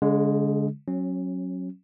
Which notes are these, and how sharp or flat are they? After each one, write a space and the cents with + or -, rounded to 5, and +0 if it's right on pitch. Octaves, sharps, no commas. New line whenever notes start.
D3 -45 G#3 +0
F#3 +0 C#4 -25